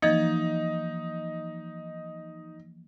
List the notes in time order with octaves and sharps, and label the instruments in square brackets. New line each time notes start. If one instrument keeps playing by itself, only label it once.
[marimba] E3 F3 A#3 [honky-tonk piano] D#4